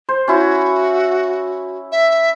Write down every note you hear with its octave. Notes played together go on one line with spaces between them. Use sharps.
C5
C#4 E4 F#4
E5